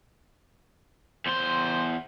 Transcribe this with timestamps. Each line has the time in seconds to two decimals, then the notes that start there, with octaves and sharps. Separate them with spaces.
1.26 E2 C5 C6